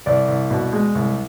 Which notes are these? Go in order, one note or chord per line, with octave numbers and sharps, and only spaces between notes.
C2 D5
C2
B2
G#3
C2